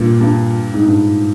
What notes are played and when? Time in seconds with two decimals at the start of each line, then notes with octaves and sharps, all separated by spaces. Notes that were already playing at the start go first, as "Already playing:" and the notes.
Already playing: G2 A#2
0.21 G2
0.74 G#2
0.86 G2